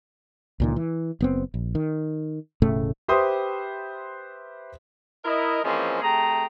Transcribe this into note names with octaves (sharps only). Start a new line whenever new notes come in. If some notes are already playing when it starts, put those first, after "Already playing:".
C#2 A#2 D#3
E3
F#1 B3 C4
A#1
D#3
E1 A2 C#3 A3
G4 B4 C5 E5 C6 D#6
E4 A#4 D#5
E3 F3 G#3 A#3 C4 C#4
C3 A3 G#4 G5 A#5